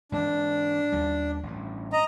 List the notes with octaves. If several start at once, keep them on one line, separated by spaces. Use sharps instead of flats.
G#2 E3 G#3 D4
D#2 G3
A1 G2
D#5 A#5